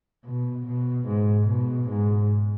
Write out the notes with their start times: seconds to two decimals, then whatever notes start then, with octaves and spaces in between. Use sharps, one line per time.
0.25 B2
0.67 B2
1.07 G#2
1.48 B2
1.89 G#2